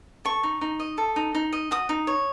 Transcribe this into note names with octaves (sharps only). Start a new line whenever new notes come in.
A4 C#6
D#4
D#4
D#5
A4
D#4
D#4
D#5
F#4 D#6
D#4
C#5